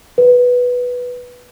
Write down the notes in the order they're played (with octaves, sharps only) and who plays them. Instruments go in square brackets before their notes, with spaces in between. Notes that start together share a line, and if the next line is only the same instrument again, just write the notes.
[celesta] B4